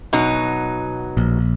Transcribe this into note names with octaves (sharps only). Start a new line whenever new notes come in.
B2 F#3 D#4
A#1